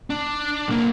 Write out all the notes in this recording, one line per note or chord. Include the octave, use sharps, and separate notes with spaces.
D4
B1 A#3